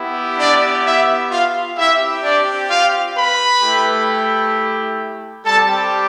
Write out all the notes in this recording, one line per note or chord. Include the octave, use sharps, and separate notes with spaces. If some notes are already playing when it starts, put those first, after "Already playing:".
Already playing: B3 E4 G4
D4 D5
E4 E5
F4 F5
C4 E4 G4 E5
D4 D5
F4 F5
B4 B5
A3 E4 G4
G3 C4 G4 A4 A5